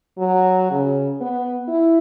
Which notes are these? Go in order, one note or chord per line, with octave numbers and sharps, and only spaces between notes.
F#3
C#3
B3
E4